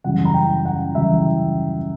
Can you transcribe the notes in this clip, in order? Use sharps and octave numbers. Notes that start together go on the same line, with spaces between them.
F#2 C#3 E3 G3 F#5
A#5
G5
F#5
F#2 C#3 E3 G3 E5